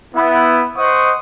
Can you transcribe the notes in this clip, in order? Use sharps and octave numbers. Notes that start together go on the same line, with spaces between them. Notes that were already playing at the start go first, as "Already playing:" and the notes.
B3 E4
C5 D#5 F#5 C6 C#6 D#6